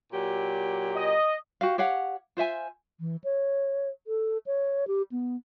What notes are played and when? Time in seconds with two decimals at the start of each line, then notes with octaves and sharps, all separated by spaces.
0.13 A#2 F#3 G4
0.95 D#5
1.61 F#4 G4 F5
1.78 G4 C#5 F5 F#5
2.37 F4 C5 E5 G#5
3.00 E3
3.24 C#5
4.07 A4
4.46 C#5
4.87 G4
5.12 B3